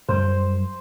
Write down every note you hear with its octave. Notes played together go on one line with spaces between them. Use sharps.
F#2 G3 C5